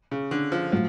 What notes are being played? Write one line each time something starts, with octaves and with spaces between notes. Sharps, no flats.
C#3
D3
F3
A2 F3 F#3